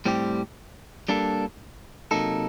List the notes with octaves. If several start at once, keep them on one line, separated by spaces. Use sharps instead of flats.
A2 G3 C4 G4
G3 A#3 D4 A4
C3 F#3 A#3 D#4 A4